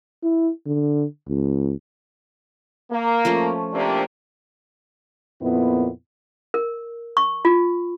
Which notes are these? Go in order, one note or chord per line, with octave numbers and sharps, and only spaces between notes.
E4
D3
C#2
A#3
F3 A3 C#4
C3 A#3 D4
F2 A#2 B3 E4
A#4
C#6
F4